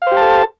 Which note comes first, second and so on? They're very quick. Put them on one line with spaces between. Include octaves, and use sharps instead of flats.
F5 C5 G4 A5 A4